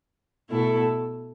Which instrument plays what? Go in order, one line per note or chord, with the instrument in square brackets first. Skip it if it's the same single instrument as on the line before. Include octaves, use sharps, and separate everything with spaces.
[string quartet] B2 A3 E4 A4